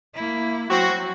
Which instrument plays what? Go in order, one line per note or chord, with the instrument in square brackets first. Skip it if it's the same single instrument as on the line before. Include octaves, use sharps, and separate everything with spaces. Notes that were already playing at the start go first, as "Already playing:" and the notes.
[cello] A#3 E4
[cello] F#3 [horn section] C4 F#4